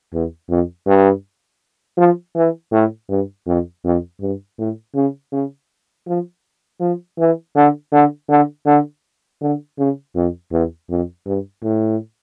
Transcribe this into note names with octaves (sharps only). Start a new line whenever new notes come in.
E2
F2
G2
F3
E3
A2
G2
F2
F2
G2
A2
C#3
C#3
F3
F3
E3
D3
D3
D3
D3
D3
C#3
F2
E2
F2
G2
A2